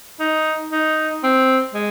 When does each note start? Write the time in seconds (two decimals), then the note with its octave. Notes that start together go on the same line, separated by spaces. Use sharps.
0.20 D#4
0.72 D#4
1.24 C4
1.74 G#3